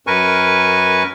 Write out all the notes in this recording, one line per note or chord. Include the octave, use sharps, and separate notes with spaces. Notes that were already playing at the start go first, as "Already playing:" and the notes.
F#2 A#4 B4 G#5 C#6